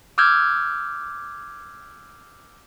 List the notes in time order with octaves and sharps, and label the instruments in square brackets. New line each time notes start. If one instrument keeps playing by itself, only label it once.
[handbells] D6 E6 F6 G6 G#6